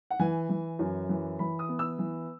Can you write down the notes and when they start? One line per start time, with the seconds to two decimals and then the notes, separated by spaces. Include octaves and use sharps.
0.10 F#5
0.19 E3 G#5
0.49 E3
0.79 F#2
1.09 E3
1.39 E3 B5
1.59 D#6
1.69 B3
1.79 E6
1.99 E3